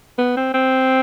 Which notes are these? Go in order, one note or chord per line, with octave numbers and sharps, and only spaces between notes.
B3
C4
C4